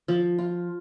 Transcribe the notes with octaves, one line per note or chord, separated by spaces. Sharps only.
F3
F4